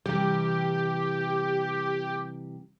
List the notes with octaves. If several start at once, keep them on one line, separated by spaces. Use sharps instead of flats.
C3 E3 G3 G4